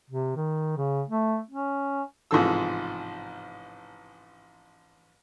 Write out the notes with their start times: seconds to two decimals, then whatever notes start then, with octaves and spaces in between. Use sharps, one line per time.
0.10 C3
0.36 D#3
0.77 C#3
1.09 A3
1.51 C#4
2.31 A1 G#2 C3 F3 A4 E6